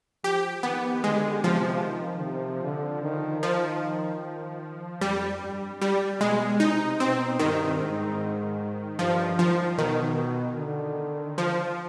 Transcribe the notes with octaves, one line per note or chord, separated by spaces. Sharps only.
F3 G4
D#3 B3
D3 G#3
C3 F3
D#3
C3
D3
D#3
D#3 F3
F2 G3
G2
G3
B2 G#3
C3 D#4
B2 C4
G2 D#3
G#2
G2 F3
F3
B2 D#3
D3
F3